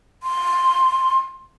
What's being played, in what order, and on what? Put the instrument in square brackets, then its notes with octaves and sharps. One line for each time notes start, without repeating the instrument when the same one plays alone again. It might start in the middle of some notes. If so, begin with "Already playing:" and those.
[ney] C6